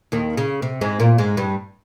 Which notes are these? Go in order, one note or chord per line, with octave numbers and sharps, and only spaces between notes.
D#2 D#3
C#3
C3
G#2 G#3
A#2 A#3
G#2 G#3
G2 G3